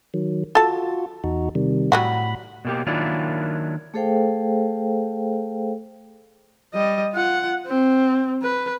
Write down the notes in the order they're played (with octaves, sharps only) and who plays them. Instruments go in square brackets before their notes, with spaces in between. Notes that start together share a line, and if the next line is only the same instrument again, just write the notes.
[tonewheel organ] D#3 F#3
[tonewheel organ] F4 F#4 [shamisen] A4 A5
[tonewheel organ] E2 D#4 F#4
C3 D#3 G3
[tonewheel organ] A2 B5 [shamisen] F#3 G3 F#4
[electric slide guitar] B2 A#3 G4
D#3 F#3 A#3 D4 E4 F4
[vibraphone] A3 G#4 A4 C5 F5 G5
[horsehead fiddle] G3 D#5
F4 F#5
C4
B4